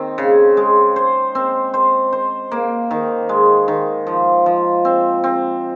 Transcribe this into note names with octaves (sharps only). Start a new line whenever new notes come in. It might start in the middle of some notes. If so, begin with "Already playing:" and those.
Already playing: D#3 C4
C#3
G#3
C5
C4
C5
C5
A#3
D#3
G#3
D#3
F3
F3
C4
C4